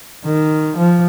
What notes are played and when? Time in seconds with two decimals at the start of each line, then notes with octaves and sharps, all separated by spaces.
0.25 D#3
0.77 F3